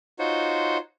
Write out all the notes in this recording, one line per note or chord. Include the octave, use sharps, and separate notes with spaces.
D#4 F4 F#4 C5 C#5